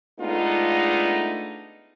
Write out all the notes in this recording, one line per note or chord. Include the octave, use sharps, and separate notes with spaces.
G#3 A3 B3 D4 D#4 F4